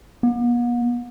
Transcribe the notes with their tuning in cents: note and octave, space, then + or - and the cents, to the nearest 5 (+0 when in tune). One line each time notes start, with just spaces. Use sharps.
B3 -45